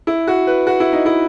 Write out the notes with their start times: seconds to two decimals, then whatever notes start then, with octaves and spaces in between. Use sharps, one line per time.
0.07 E4
0.27 F#4
0.47 B4
0.67 F#4
0.80 E4
0.93 D#4
1.06 E4